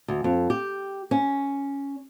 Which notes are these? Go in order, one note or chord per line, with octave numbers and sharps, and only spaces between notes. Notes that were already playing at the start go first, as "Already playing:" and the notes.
D2
F2
G4
C#4